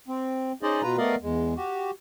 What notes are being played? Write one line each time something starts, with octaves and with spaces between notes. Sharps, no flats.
C4
C#4 D#4 G#4 C5 D5 D#5
B2 F4 B4 A#5
A3 B3 A#4 D5 D#5 F5
E2 G#3
F#4 G4